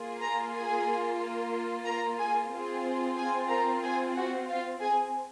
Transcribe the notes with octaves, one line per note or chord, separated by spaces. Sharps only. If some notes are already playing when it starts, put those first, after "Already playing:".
Already playing: A#3 F4 G#4
A#4 A#5
G#4 G#5
A#4 A#5
G#4 G#5
C4 F4 G#4
G#4 G#5
A#4 A#5
G#4 G#5
F#4 F#5
F4 F5
G#4 G#5